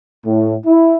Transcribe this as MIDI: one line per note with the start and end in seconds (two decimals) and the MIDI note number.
0.25 0.55 45
0.66 0.97 64